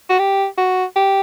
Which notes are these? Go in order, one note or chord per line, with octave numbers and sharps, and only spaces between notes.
F#4
G4
F#4
G4